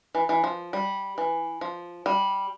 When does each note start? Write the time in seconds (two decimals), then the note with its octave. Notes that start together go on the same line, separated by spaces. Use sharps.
0.15 E3
0.29 E3
0.44 F3
0.73 G3
1.18 E3
1.61 F3
2.06 G3